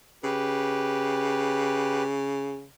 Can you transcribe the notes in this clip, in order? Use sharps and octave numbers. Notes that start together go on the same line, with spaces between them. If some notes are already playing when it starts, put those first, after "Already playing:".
C#3 G4 B4